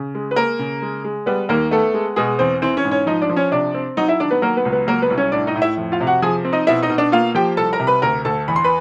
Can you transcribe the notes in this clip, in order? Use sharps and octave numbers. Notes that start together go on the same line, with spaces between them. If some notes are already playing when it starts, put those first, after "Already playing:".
Already playing: C#3
G#3
B4
A#3 A#4
C#3
G#3
G#3
G3 B3 B4
D#2 A#3 A#4
A3 B3 A4
G#3
B2 G#3 G#4
E2 C4 C5
E3 C4 C5
C#4 C#5
G#2
C#4 C#5
F3 D#4 D#5
D4 D5
F3
C#4 C#5
C3 D4 D5
C4
F#3 D#4 D#5
E4 E5
D#3 D4 D5
B3 B4
F#3 A#3 A#4
B3 B4
C#2
B3 B4
F#3 A#3 A#4
B3 B4
C2
C#4 C#5
A2 D4 D5
D#4 D#5
A2
E4 E5
F2
F4 F5
C3
F#4 F#5
F3 G#4 G#5
C4
D#4 D#5
B2 E4 E5
D#4 D#5
B2
D4 D5
A#3 F4 F5
F3 G4 G5
C2 A4 A5
A#4 A#5
C3
B4 B5
D2 A#4 A#5
D2 A4 A5
E2 B5
C6
B4 B5